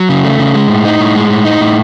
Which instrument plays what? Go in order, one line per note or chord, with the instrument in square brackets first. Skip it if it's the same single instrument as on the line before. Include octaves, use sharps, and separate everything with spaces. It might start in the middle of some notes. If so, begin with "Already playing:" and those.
Already playing: [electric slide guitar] F#3
C#3
A3
C#3
G#3
A2
D#4
A2
G#3
A2
D#4
A2